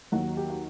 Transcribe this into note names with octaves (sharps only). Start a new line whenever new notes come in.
D#2 D#3 F#3 F#4
G4
F#4